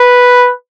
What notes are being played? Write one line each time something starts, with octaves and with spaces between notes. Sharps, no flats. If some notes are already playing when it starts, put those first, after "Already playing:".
Already playing: B4